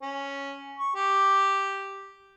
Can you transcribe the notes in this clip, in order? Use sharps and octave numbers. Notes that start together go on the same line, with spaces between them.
C#4
C#6
G4